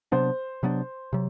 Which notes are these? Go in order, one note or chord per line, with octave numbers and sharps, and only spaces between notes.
C3 F#3 B3 D4 C5
C3 F#3 B3 D4
C3 F#3